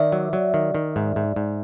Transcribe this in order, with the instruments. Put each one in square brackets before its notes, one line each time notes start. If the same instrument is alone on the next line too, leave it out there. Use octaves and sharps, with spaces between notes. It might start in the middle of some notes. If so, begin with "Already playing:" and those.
Already playing: [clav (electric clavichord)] D#3 [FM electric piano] D5 E5
[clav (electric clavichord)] F#3
F#3
D#3
D#3
G#2
G#2
G#2